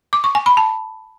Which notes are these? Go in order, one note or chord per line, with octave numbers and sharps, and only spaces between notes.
D6
C#6
G#5
B5
A5